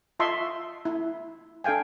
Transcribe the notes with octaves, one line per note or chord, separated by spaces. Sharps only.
F4 D#5 E5 A5 C6 C#6
E4
D4 A4 F5 G5 G#5